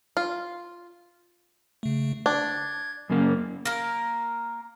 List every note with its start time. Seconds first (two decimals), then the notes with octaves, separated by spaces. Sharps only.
0.17 F4
1.83 C#3 A3
2.26 D4 G#6
3.10 F#2 C#3 A#3
3.65 A#3 A#4